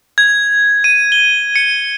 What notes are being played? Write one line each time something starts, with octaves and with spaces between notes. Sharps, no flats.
G#6
D#7
G7
C#7